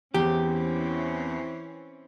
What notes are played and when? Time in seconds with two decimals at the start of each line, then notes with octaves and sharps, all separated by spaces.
0.14 E2 E3 C4 C#4 G4